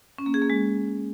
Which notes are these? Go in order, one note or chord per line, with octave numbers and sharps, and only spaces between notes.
C#4
A#3
G#4
A#3
G#3